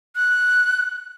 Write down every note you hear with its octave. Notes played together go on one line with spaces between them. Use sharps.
F#6